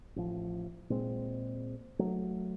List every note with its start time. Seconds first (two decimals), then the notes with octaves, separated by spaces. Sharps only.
0.16 A1 F3
0.90 A#2 G#3 C4
1.99 F#3 A3